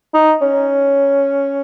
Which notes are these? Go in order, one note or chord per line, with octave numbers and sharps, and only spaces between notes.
D#4
C#4